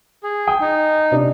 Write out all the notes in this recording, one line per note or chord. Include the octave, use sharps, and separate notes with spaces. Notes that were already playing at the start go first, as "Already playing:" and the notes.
G#4
G5 G#5 D#6
D#4
C3 D4